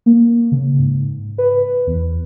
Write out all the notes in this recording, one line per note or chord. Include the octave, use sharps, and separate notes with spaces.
A#3
C#3
G#2
B4
E2